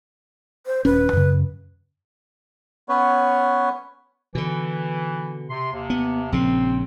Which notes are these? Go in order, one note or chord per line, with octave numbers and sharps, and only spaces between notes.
C5
D#1 C#4 B4
F#2 C#3
B3 C#4 B4 C#5
B2 D3 E3
C3 C6
D#2 C3
B3
A#1 C#3 C4